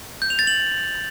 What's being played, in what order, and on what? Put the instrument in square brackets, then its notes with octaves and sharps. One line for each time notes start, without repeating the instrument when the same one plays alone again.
[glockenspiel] G6
F7
A6
F#7